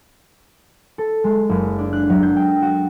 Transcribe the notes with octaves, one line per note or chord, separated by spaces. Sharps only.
A4
G#3
F#1
D4
F#6
F#3
G6
G5
F#4